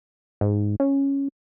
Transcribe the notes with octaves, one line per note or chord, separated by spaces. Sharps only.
G#2
C#4